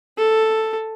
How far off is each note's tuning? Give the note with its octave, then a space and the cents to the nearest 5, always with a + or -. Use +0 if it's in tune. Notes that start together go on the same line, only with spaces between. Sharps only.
A4 +5